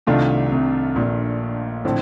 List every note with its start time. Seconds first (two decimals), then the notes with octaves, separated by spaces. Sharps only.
0.07 C2 C3 D#3 A3 D4 F4
0.51 C2 C3
0.96 A#1 A#2
1.85 A2 D3 F3 C4